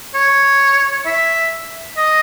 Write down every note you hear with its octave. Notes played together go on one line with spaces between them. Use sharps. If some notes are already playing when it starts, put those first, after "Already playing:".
C#5
E5
D#5